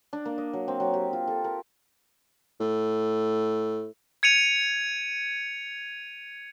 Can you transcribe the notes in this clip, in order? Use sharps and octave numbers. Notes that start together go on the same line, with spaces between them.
D4
A#3
D#5
F#3
C4
F#3
G4
F4
A4
A#4
A2
G#6 C#7 D#7 F7